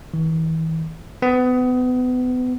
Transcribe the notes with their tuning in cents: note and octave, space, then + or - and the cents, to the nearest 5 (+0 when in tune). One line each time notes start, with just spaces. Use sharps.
E3 -40
B3 +30